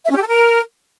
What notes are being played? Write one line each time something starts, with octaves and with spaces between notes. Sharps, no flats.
E5
C#4
G4
A4
A#4